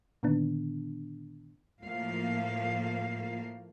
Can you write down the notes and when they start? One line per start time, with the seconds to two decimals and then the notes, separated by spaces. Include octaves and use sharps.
0.23 A#2 D3 D#3 B3 D4
1.83 A2 F3 A#3 F5